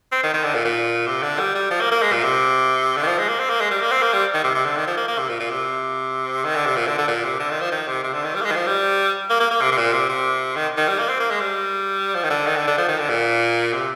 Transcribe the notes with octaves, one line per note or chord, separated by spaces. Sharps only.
C4
D#3
D#3
D3
A#2
A#2
C3
D3
G3
G3
F3
A#3
A#3
G#3
A#2
C3
D3
D#3
F3
G#3
A#3
C4
A#3
G#3
G3
A#3
C4
A#3
G3
D#3
C3
C3
D3
D#3
F3
A#3
A#3
C3
A#2
A#2
C3
D#3
D3
C3
A#2
D3
D3
A#2
C3
D3
D#3
F3
D#3
C3
C3
D3
D#3
G3
A#3
G#3
D#3
F3
G3
A#3
A#3
A#3
C3
C3
A#2
C3
C3
D#3
D#3
G3
A#3
C4
A#3
G#3
G3
F3
D#3
D3
D#3
D3
D3
F3
D#3
D3
A#2
C3